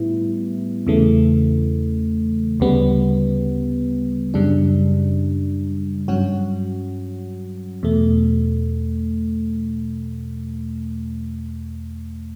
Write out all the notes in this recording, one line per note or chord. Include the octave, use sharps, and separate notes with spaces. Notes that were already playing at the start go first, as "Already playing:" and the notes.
Already playing: A2 G3 B3 E4
E2 C#3 E3 A3
D2 C#3 G3 B3
F#2 C#3 G3 D4
G2 F#3 C#4 F#4
E2 B2 A3